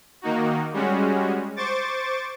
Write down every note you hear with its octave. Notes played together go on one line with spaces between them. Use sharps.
D#3 A#3 D#4 F#4
G3 G#3 C#4 F#4
C5 C#6 D6 A6